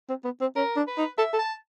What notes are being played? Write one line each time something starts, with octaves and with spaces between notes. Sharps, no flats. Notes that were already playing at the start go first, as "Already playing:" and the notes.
C4
B3
C4
C#4 A#4
D4
B4
D#4
A4 E5
A4
A5